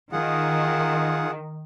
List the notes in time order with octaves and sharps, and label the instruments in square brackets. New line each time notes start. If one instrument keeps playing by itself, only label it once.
[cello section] D#3 [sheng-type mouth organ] F4 G#4 F#5